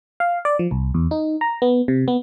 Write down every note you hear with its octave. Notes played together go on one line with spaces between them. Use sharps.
F5
D5
F3
C2
E2
D#4
A#5
B3
C3
B3